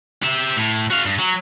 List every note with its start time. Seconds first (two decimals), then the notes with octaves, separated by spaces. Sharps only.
0.23 G4 E5
0.57 A2
0.90 F#4 F5
1.06 G2
1.19 F#3